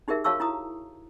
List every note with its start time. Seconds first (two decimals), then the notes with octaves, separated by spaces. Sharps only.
0.08 D#4 G4 G#4 A#4 E5
0.24 F#4 C#5 F5 A5 C#6 E6
0.40 E4 A#5 D#6